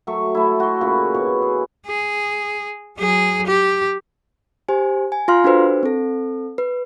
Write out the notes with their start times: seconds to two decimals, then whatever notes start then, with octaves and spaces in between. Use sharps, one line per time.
0.07 F#3 A3 E5 C#6
0.35 A3 E4
0.60 F#4 C6
0.81 A#2 C#3 E4 C#5
1.14 B2 C#5
1.42 G#4
1.86 G#4
2.98 F#3 G#4
3.46 G4
4.68 G4 C5 G#5
5.12 G#5
5.28 F4 F5 C6 F6
5.44 D4 F#4 A4 B4 C5
5.83 C4 A4
6.58 B4